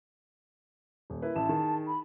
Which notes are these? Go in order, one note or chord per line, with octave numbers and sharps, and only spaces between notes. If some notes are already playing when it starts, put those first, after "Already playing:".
D#1
E4 A#4 B4
A1 E4 A5 E7
D#3 G#4
B5